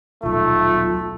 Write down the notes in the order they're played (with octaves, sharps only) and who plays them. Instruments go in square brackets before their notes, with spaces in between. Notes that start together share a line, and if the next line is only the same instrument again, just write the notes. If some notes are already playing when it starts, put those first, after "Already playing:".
[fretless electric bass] D#1 B1 [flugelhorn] A3 [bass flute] F4